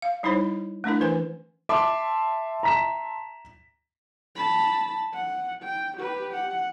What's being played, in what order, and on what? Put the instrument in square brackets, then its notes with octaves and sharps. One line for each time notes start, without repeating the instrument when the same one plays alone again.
[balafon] F5
G3 D#4 E4 C5 C#5
A3 C#4 D4 E4 A#4
E3 B4 C5 G#5
[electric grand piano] E5 A5 C6 [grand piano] D6
[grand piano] A#5 B6 E7
[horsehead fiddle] A5 B5
F#5
G5
G4 B4
F#5